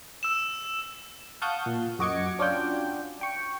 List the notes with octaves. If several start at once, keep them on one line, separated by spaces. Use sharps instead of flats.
E6 E7
F5 F#5 A5 C#6 D#6 G6
A#2
F#2 F#4 D#5 D6 G#6 C#7
C#4 D4 F4 F#4 G5
G5 C#6